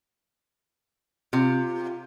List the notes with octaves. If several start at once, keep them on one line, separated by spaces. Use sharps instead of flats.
C3 F4